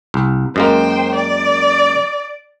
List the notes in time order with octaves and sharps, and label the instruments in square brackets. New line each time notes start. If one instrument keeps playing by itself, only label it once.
[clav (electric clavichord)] C2
[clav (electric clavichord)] F#2 G#3 A#3 [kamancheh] C5 G5
[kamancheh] D5